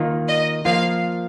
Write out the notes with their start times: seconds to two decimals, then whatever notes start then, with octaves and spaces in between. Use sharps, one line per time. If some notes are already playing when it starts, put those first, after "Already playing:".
Already playing: D#3 A#3 F4
0.28 D#5
0.65 F3 A#3 F4 F5